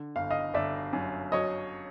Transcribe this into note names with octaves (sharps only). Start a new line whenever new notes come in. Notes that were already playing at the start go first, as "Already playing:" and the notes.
Already playing: D3
G1 F5
D#5 F5
G1 D5 E5
F#2
F#3 C#5 D#5